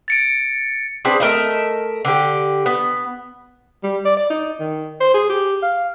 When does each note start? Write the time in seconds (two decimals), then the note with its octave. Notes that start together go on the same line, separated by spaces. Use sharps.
0.08 A6 C#7 D7
1.05 C4 D4 G#4 B4
1.20 A3 A#4 D#5 E5
2.05 D3 G4
2.66 B3
3.84 G3
4.05 D5
4.17 D5
4.30 D#4
4.60 D#3
5.01 C5
5.14 G#4
5.29 G4
5.63 F5